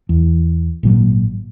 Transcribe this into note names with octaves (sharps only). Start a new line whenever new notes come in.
E2
G#1 A#2 F#3